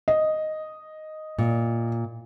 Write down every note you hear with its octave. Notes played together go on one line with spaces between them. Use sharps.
D#5
A#2